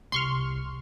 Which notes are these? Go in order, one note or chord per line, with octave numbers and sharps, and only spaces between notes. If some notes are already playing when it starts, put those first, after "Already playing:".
C2 C6 C#6 F6